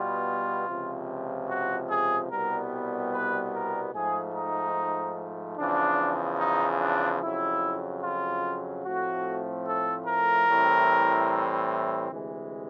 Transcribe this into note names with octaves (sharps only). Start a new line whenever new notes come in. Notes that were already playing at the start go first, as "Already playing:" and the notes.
Already playing: B2 G3 B3 F4
C#2 C3 F3
F#4
G#4
C2 B2 G3 B3 A#4
B4
A#4
G#2 F3 A3 G#4
D#4
E2 C#3 F3 D4
D#4
D4
F2 C#3 F#3 E4
F4
A2 F3 A3 C4 F#4
A4
A#4
A2 E3 G3 C4
D2 C3 E3 G#3